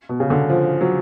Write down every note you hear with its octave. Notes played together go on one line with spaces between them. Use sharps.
B2
C#3
D3
F3
F#3